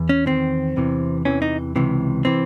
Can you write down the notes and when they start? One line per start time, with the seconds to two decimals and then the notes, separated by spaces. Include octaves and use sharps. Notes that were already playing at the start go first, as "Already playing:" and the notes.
Already playing: E2
0.09 C#4
0.26 E2 D#3 C4
0.77 E2 C3 E3
1.25 E2 C3 E3 C#4
1.42 D#4
1.76 C#2 C3 E3
2.25 C3 E3 C4